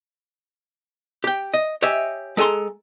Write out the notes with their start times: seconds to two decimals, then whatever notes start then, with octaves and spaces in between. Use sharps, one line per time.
1.24 G4 G5
1.54 D#5
1.82 G4 C#5 D#5 E5 G#5
2.37 G#3 A4 G#5 A#5 C6